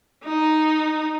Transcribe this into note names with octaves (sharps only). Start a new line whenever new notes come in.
D#4